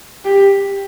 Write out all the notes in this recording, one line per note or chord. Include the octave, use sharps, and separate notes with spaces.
G4